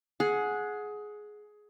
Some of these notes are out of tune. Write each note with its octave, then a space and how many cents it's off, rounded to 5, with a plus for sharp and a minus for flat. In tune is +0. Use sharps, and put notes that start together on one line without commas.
G#4 +15 F#5 -15